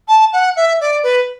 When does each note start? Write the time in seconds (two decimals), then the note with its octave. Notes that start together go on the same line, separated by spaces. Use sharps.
0.08 A5
0.33 F#5
0.56 E5
0.81 D5
1.03 B4